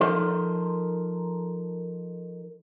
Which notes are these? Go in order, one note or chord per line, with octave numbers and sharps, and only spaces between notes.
F3 D#4 A4 A#4 C5